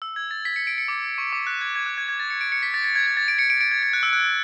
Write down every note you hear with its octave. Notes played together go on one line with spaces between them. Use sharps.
E6
G#6
A6
B6
C#7
D7
C#7
D6
C#6
D6
F#6
G#6
G#6
F#6
G#6
G#6
A6
C#7
D7
C#7
B6
A6
A6
G#6
G#6
A6
D7
C#7
D7
D7
G#6
G#6
F#6
E6
F#6